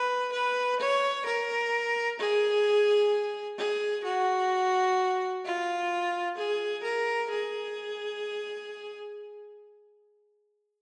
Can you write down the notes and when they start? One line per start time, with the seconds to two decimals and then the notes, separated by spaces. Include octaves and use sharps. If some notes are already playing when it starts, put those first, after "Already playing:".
Already playing: B4
0.32 B4
0.80 C#5
1.26 A#4
2.20 G#4
3.58 G#4
4.04 F#4
5.45 F4
6.38 G#4
6.84 A#4
7.30 G#4